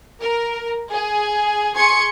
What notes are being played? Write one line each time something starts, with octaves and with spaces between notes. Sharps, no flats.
A#4
G#4
G#4 C6 C#6 G#6 C#7